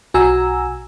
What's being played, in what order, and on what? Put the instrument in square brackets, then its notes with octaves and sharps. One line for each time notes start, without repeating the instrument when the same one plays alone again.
[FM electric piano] B1 F#4 G#5 A#5 E6